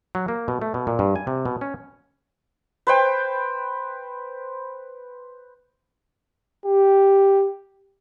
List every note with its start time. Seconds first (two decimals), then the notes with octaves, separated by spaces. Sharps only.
0.15 F#3
0.28 A#3
0.48 B2
0.62 A3
0.74 B2
0.87 A#2
0.99 G2
1.16 G#5
1.27 C3
1.45 B2
1.61 C#4
2.87 B4 C5 G5
6.66 G4